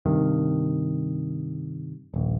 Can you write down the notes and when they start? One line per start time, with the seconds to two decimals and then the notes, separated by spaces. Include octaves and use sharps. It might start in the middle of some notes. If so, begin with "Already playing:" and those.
0.06 G2 C3 D#3
2.14 D#1 A#1